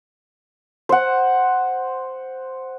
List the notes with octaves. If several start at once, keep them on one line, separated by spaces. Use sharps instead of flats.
C5 F#5